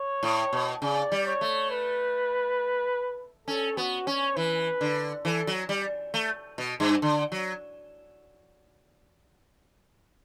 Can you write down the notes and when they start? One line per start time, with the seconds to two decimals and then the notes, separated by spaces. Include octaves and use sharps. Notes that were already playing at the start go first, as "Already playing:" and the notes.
Already playing: C#5
0.23 A2
0.53 B2
0.82 C#3 D5
1.12 G3
1.27 C#5
1.41 A3
1.71 B4
3.48 C#4 A4
3.77 B3 F#4
4.07 C#4 C#5
4.36 E3 B4
4.81 D3
5.25 E3 A4
5.47 F#3
5.69 G3
6.14 A3
6.58 B2
6.80 G2
7.02 D3
7.32 F#3